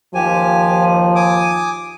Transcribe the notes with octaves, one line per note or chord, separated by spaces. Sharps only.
D#2 F3 G4 G#5
G#5 D6 D#6